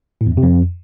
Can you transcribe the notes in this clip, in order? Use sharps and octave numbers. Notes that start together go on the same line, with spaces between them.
A2
E2
F#2
C3
F2